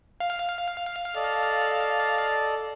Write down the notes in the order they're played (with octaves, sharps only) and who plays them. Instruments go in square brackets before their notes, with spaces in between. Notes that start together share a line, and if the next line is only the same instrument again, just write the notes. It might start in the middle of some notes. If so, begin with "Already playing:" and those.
[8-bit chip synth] F5
[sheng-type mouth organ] A4 D5 D#5